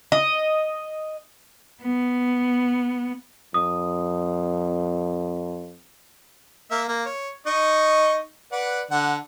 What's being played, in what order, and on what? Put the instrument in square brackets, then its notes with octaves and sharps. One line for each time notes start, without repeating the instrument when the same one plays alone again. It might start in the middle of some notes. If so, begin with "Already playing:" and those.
[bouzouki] D#5
[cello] B3
[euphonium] F2 [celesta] D#6
[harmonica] A#3 E5
A#3
C#5
D#4 D#5 C#6
B4 D5 F#5
D3 F#5